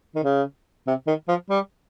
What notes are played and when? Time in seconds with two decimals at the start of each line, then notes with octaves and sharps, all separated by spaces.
0.15 D#3
0.24 C#3
0.87 C3
1.07 D#3
1.28 F3
1.50 G3